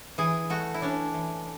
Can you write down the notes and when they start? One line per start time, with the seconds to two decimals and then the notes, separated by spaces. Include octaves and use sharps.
0.18 E3 G#4
0.50 A3 F#4
0.74 E4
0.82 C#4 D4
1.14 E3